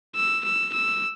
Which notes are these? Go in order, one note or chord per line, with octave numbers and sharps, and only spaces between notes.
E6
E6
E6